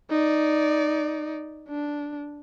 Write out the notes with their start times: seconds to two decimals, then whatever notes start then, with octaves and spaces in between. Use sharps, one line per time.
0.11 D#4 D5
1.69 D4